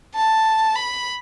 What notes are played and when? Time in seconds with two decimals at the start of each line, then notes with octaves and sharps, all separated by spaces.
0.15 A5
0.75 B5